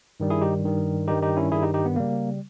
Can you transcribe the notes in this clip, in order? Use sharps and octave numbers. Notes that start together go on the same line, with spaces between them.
G2 D#3 G3
E4 G#4
D#4 G4
G2 D#3 G3
G2 D#3 G3 D#4 G4
D#4 G4
C#4 E4
G2 D#3 G3 E4 G#4
D#4 G4
D#4 G4
B3
C#3 G3 A#3